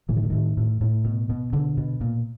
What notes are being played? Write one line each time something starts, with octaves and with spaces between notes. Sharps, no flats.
A2 E3
D#3
D3
A2 D#3
A2
A2
B2
B2
B2 D3
B2
A#2